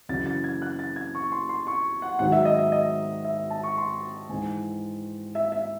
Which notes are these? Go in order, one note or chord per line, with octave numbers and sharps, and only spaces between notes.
F#2 C#3 E3 A6
A6
G#6
F#6
A6
G#6
C#6
C6
C6
C#6
F#5
G#2 D#3 F#3 F#5
E5
D#5
E5
D#5
E5
A5
C#6
C6
G#2 E3 G#5
E5
E5